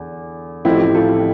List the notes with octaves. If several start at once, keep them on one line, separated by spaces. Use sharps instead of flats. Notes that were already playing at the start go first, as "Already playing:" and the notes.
Already playing: E2 D3
A1 A2 F3 C4 E4 G4
F4 A4